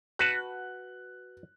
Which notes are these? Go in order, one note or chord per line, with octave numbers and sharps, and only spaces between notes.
F#4 B4 A5 F#6